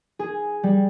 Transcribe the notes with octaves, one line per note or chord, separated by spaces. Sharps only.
G#4
G3